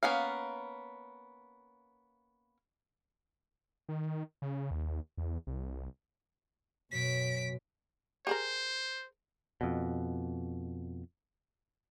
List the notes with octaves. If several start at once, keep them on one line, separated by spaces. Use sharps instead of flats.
A#3 B3 C#4 F5
D#3
C#3
D#2
E2
C2
F#2 B2 B6 D7
G4 G#4 A#4 C5
F2 B2